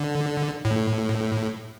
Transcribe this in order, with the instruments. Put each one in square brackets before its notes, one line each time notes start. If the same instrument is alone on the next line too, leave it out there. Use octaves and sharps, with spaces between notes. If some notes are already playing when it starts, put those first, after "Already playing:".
Already playing: [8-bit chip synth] D3
A2